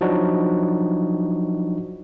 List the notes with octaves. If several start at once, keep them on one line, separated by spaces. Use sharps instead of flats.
F3 F#3 D4 D#4 F#4